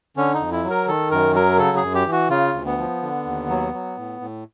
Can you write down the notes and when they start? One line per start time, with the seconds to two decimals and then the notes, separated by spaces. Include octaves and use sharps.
0.17 D3 C#4
0.34 D#4
0.40 F2
0.52 E4
0.64 F#3
0.70 A#4
0.88 D#3 A4
1.11 F#2 A#4
1.35 F#3 A#4
1.58 C#3 A4
1.77 G#4
1.83 F#2
1.95 G4
2.06 E3
2.12 F#4
2.30 C#3 F4
2.54 D2
2.66 B3
2.78 F3
3.02 D3
3.25 D#2
3.49 F#3
3.73 F#3
3.97 A2
4.21 A2